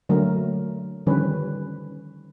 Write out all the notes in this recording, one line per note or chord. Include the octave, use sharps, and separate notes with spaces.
D3 F#3 A3 A#3 A#4
D3 D#3 F3 G3 C#4 B4